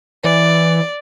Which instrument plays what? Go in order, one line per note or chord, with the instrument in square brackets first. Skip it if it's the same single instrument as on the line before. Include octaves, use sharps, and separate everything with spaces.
[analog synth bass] E3 [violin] D5